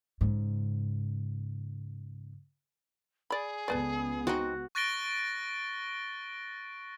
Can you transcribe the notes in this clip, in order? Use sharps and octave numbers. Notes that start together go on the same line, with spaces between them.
G#2 C#3
G#4 D5 B5
C#2 B3 A4 B4 D5
C4 D#4 F#4
C#6 F#6 A6 A#6 D7 G7